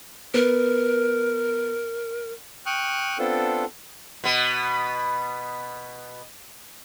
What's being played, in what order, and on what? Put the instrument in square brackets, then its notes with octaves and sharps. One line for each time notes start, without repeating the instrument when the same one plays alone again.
[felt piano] B3 [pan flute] A#4
[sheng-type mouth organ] G5 C#6 D#6 F6 F#6
B3 C4 D4 F4 A4
[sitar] B2 B3